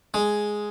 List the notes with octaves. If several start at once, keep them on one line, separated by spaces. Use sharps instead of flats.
G#3